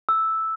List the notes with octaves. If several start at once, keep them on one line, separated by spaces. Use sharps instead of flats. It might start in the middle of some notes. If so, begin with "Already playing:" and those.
E6